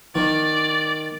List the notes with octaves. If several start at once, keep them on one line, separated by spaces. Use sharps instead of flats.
D#3 D5